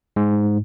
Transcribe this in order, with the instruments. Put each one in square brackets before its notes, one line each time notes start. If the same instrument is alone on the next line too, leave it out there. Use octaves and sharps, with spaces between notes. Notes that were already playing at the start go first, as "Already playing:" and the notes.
[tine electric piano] G#2